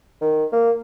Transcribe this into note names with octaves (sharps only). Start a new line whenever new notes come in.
D#3
A#3